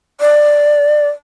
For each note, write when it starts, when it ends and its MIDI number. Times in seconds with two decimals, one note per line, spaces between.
0.20 1.09 74